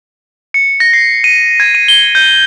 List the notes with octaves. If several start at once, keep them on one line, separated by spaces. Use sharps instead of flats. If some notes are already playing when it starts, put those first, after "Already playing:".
C#7
A#6
C7
D#7
G#6
D#7
G7
G6